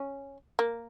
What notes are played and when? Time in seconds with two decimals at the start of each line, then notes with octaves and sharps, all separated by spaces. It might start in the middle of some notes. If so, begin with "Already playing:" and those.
Already playing: C#4
0.59 A#3